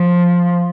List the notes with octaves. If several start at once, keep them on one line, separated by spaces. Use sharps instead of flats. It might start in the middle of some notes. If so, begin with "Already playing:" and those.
Already playing: F3